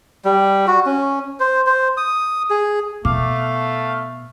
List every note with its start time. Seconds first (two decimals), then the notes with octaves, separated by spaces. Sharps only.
0.25 G3
0.67 F#4
0.86 C#4
1.40 C5
1.66 C5
1.97 D#6
2.50 G#4
3.05 B2 A3 F5 D6